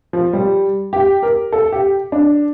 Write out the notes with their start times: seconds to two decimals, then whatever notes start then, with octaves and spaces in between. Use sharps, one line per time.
0.13 F3
0.33 G3
0.93 G4
1.23 A#4
1.52 A4
1.72 G4
2.12 D4